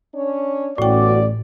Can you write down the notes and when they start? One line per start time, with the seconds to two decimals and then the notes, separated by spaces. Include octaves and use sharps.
0.14 C#4 D4 C#5
0.78 A1 A2 B3 C#4 F#4 D5 G5